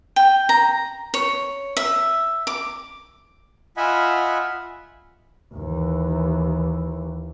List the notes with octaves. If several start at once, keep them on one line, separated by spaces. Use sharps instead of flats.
G5
A#5
C#5
E5
D6
F4 D#5 E5 F#5 G#5 B5
D#2 E3